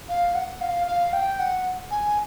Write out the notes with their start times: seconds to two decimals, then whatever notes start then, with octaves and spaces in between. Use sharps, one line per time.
0.09 F5
0.35 F#5
0.61 F5
0.87 F5
1.13 G5
1.39 F#5
1.91 G#5